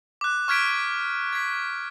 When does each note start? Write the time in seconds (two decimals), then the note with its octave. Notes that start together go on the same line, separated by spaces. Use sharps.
0.21 D6 F#6
0.48 C#6 F6 G#6 B6 D7
1.33 G#6 B6